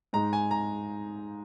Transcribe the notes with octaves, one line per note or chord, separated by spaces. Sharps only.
G#2 G#3 D#4 A#5
G#5
A#5